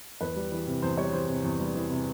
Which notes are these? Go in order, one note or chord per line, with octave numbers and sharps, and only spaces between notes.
E2 B4
G3
E3
C3
E2 C5
G3 C#5
E3 C5
C3
E2
G3
E3
C3